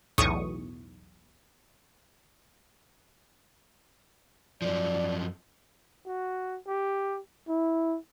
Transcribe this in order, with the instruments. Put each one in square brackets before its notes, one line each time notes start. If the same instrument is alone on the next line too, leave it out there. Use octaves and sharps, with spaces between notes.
[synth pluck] B1 E2 A2 C#6 D#6
[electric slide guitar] F#2 F3 [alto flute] D5
[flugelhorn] F#4
G4
E4